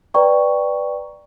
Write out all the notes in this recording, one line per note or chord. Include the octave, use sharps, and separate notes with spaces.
B4 D5 G5 A#5 C#6